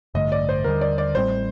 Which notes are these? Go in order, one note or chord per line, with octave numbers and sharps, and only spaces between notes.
A1 G2 D3 A3 D#5
D5
C5
D#2 D3 G3 A#4
D5
D5
A1 A2 G3 C4 C5